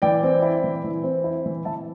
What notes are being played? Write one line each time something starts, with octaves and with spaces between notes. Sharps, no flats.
E3 D5 G5
C4
E4
E3
E3
C4
E4
E3
E3 E5 A5